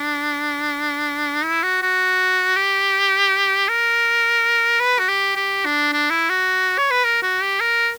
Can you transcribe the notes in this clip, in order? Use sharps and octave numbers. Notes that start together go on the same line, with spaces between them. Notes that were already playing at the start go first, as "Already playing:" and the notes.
Already playing: D4
E4
F#4
F#4
G4
A#4
B4
F#4
G4
G4
D4
D4
E4
F#4
C#5
B4
A#4
F#4
G4
A#4